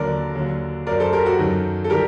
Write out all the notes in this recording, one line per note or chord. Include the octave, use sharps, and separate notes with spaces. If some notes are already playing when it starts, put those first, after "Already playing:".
Already playing: D#2 D3 F#3 A#4 D5
D#2 D3 F#3
F#2 F#3 A#4 D5
A4 C5
G4 A#4
F#4 A4
F#2 D#3 F#3
A4
D#3 G3 G4 A#4